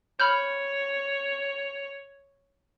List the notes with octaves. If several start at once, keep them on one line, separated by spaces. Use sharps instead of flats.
C#5 B5 F6 G6